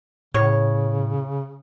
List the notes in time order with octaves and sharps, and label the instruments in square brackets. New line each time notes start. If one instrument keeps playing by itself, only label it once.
[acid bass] A2 [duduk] C#3 [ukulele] C#5